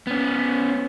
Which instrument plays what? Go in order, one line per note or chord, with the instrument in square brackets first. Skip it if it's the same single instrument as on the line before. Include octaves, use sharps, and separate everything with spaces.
[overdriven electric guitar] B3 C#4